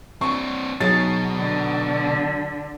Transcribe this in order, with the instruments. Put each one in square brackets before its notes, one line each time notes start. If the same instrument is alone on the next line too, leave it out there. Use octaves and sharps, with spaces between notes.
[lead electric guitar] C4 D4 [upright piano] C#6
[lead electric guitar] B2 [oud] F#3 D#4 G#4 [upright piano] A6
[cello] D3